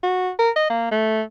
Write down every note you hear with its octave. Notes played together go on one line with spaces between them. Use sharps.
F#4
A#4
D#5
A#3
A3